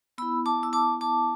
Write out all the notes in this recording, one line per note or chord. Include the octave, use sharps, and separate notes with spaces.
B3 E4 B5 E6
A5 D6
E6
A5 D6
A5 D6